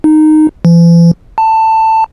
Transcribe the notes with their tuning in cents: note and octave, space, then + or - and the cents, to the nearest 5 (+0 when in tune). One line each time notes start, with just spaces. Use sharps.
D#4 -10
E3 +45
A5 +15